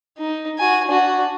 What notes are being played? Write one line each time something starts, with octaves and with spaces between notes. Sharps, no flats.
D#4
F#4 G#5
D4 F#4